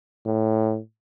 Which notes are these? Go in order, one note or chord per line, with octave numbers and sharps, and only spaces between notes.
A2